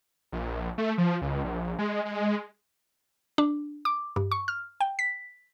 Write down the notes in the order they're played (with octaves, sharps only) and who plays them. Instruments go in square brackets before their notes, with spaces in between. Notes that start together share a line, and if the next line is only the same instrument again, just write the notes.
[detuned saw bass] A#1
A3
F3
C#2
A#1
G#3
G#3
[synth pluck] D4
D6
G2
C#6
F6
G5
B6